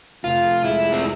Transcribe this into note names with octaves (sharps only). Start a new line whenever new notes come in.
F1 F4
F2
G#3 E4
G#3
C4